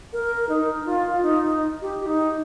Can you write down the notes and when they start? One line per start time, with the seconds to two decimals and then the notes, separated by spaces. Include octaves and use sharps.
0.13 A#4
0.49 D#4
0.86 F4
1.22 D#4
1.82 G4
2.06 D#4